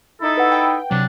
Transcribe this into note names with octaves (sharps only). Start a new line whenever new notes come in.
D#4 E4 A4
B4 F#5
G5
C3 F#3 D4